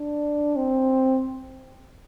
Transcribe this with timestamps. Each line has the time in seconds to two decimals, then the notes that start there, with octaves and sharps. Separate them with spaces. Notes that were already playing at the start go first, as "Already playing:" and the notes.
Already playing: D4
0.56 C4